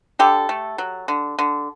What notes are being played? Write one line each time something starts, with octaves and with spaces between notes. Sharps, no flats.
D3 G4 A4
A3
F#3
D3
D3